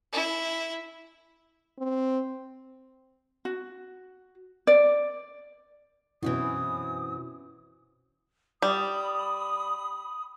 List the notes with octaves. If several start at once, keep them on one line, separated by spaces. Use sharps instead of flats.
E4
C4
F#4
D5
F#2 B2 E3 C4 C#4 E4 F#4 D#6
G3 B5 D#6